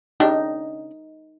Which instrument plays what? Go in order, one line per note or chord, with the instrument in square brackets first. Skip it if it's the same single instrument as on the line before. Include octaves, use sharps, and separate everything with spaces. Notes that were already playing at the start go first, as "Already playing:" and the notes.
[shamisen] C#3 D4 G4 [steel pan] D#4